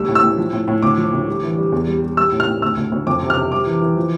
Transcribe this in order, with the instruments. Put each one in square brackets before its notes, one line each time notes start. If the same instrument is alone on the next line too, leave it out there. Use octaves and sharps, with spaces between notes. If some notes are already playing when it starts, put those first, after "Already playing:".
Already playing: [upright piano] D2 G3 E6
A2
E6
A2
F3
A2
A2
D2 D6
F3
D2
G3
E3
G3
E2
G3
G3
G3 E6
A2
F6
A2
D2 E6
D2
D2
F2 D6
C3
F6
C3
G3 D6
E3
E3
F3